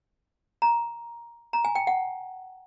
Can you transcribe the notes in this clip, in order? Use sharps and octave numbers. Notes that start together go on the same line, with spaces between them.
A#5
A#5
G#5
G5
F#5